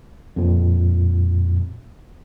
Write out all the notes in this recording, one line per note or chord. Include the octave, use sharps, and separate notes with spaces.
F2 A#2